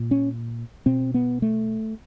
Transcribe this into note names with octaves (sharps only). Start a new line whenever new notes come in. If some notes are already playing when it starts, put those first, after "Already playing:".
Already playing: A#2
C#4
B2 C4
B3
A3